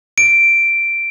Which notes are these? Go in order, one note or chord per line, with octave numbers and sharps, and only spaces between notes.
D7